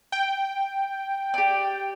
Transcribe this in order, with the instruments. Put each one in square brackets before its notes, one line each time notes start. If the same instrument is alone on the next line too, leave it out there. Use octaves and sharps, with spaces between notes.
[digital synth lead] G5
[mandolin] G4 D5